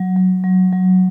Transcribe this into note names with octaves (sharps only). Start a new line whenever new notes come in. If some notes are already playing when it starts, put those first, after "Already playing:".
Already playing: F#3
F#3
F#3
F#3